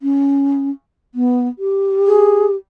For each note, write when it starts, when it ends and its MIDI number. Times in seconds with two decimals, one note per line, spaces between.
0.02 0.70 61
1.15 1.48 59
1.59 2.56 67
2.07 2.46 68